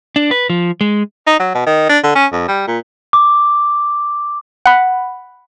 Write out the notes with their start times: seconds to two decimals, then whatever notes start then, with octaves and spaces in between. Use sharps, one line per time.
0.16 D4
0.31 B4
0.50 F3
0.81 G#3
1.27 D#4
1.40 F#3
1.54 B2
1.66 D#3
1.89 D4
2.04 D3
2.15 C#4
2.32 F2
2.48 G3
2.67 A#2
3.13 D6
4.66 F#5 B5